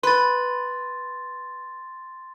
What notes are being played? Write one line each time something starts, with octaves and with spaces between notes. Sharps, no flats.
B4 C6 A6